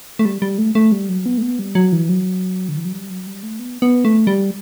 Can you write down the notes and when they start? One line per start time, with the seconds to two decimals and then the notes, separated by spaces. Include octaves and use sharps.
0.19 A3
0.25 G3
0.42 G3
0.58 A3
0.75 A3
0.92 G3
1.09 F#3
1.26 B3
1.38 A3
1.42 B3
1.59 G3
1.75 F#3
1.92 E3
2.09 F#3
2.69 D3
2.77 E3
2.85 F#3
2.92 G3
3.10 F#3
3.27 G3
3.43 A3
3.59 B3
3.82 B3
4.05 A3
4.27 G3